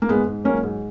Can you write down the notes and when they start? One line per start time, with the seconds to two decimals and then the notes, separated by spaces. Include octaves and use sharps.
0.02 A#3
0.08 G#2 G#3 B3
0.26 G#2
0.44 F#3 A#3 C#4
0.63 G#2